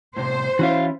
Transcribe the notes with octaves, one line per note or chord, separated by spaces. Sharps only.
A2 C3 C5
E3 C#4 E4 F#4 F5